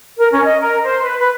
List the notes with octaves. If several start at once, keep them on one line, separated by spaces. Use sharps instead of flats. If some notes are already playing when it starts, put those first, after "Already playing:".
A#4
C#4
D#5
A#4
C5
B4
B4